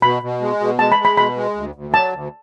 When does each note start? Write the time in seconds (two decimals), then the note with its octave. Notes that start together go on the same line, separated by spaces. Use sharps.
0.02 B2 B5
0.23 B2
0.41 G#3
0.60 B2
0.79 G#3 A5
0.92 B5
0.99 G#3
1.05 B5
1.17 B2 B5
1.36 G#3
1.56 D2
1.75 D2
1.94 F#3 A5
2.13 D2